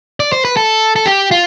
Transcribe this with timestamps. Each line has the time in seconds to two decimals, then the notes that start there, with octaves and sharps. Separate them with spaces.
0.20 D5
0.32 C5
0.45 B4
0.57 A4
0.96 A4
1.06 G4
1.31 F4